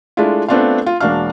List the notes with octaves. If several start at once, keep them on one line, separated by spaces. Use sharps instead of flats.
G#3 A3 D4 E4 F4
A3 B3 C4 D4 F4 F5
F4
E1 A#3 D4 F#4 F5 F6